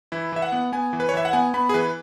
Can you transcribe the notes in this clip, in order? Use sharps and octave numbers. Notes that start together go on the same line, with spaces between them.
E3 E4
E3 E5
F#5
B3
B3 G#5
E3
B4
C#5
E3 E5
F#5
B3 G#5
B3 B5
G#4
E3 B4